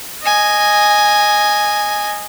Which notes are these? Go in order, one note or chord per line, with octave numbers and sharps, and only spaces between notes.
D#5 G#5